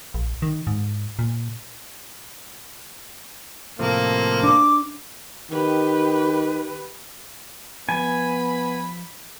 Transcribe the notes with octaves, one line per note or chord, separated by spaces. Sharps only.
A#1
D#3
G#2
A#2
A2 C3 F3 A#3
D4 D6
D#3 G4 B4
F3 B3 G#5 B5